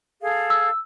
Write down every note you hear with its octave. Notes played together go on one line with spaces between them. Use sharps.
G#4 A4 F5
E6